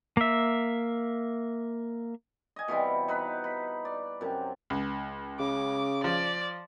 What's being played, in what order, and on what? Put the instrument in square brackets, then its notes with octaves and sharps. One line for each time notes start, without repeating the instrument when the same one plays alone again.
[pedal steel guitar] A#3 E5
[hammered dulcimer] D#5 G#5
B2 E3 G3 C4
D#4 B4
B5
D5
F#2 C3
[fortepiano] C#2
[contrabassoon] C#3 [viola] D6
[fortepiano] F3 [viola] D5